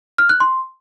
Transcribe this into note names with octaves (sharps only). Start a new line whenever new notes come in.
F6
F#6
C6